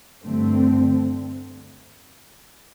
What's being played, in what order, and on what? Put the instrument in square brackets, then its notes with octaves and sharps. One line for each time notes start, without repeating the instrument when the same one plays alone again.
[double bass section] G2 D3 A3 C4